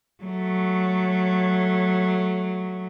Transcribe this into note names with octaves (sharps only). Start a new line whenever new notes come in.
F#3 A3